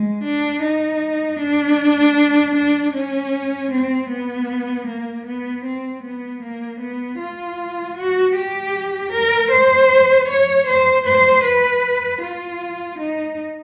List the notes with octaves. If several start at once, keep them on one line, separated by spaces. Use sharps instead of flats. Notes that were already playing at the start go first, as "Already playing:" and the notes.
Already playing: G#3
D4
D#4
D4
D4
C#4
C4
B3
A#3
B3
C4
B3
A#3
B3
F4
F#4
G4
A#4
C5
C#5
C5
C5
B4
F4
D#4